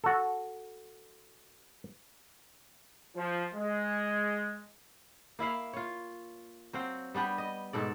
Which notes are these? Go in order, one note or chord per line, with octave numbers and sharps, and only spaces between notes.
F#4 A4
F3
G#3
A#3 E4 E5 F5
F4 C#5
F#3 C4 F5 G5
G3 B3 D4 G4
D#5
G#2 B2 A4 D5